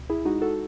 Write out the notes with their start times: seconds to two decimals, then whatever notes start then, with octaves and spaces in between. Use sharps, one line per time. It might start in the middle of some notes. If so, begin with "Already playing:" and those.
Already playing: C#2 B2
0.10 E4 G#4
0.25 G#3 D#4 F#4
0.42 F#4 A4